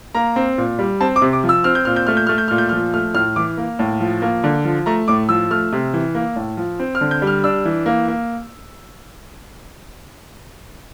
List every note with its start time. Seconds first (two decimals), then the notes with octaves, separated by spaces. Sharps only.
0.15 A#3 A#5
0.36 C4
0.58 A#2
0.79 G3
1.01 C4 A5
1.16 D6
1.22 C3
1.33 D6
1.44 F3
1.49 E6
1.64 C4 F6
1.75 G6
1.85 A#2 F6
1.96 G6
2.07 A3 F6
2.17 G6
2.27 A3 F6
2.38 G6
2.48 A#2 F6
2.58 G6
2.69 F6
2.72 F3
2.93 A3 F6
3.14 A2 F6
3.36 E3 D6
3.58 A#3
3.79 A2
4.00 F3
4.22 A#3
4.44 D3
4.65 F3
4.86 A3 A#5
5.08 A2 D6
5.29 F3 E6
5.51 A3 F6
5.73 C3
5.93 E3
6.15 A#3
6.36 A2
6.57 F3
6.79 C4
6.95 F6
7.01 D3
7.11 G6
7.22 G3
7.27 F6
7.44 D4 E6
7.65 E3
7.86 A#3
8.08 A#3